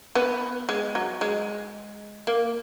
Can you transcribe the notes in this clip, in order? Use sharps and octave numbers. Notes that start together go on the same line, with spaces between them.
B3
G#3
F#3
G#3
A#3